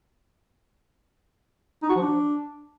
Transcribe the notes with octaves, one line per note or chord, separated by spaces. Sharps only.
D#4
F#4
F3
D4